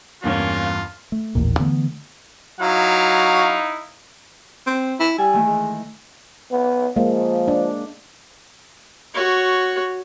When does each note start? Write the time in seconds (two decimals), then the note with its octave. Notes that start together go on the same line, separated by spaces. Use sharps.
0.24 E2 G2 A#3 C#4 F4
1.12 A3
1.35 A1 D#2 A#2
1.59 D3 E3 A3 B3
2.60 F#3 D#4 E4 F5
4.67 C4
5.00 E4
5.18 G3 G#5 E6
5.33 D#3 E3 A3
5.46 G#3
6.52 B3
6.96 F3 G#3 A#3
7.48 D4
9.14 F#4 C#5